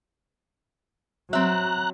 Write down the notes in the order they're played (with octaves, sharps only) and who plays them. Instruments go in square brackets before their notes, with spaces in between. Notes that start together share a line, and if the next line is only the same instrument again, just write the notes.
[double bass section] F#3 [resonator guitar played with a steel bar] C4 E5 [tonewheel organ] A#5 F#6